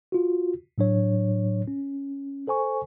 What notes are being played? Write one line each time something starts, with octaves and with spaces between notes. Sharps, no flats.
F4 F#4
A2 F#3 D4 C#5
C#4
A4 C5 G#5 C#6